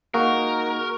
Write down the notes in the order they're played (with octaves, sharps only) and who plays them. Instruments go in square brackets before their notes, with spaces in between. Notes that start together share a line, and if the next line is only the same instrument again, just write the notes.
[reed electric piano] A#3 [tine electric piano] D#4 G#4 [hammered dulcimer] F#4 [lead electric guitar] A#4